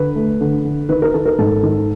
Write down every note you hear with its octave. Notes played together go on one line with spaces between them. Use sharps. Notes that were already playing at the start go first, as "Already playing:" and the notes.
Already playing: D3 B4
A3
D3
D3
D#3 B4
A#4
D#3 A4
A#4
G#2 A4
D#3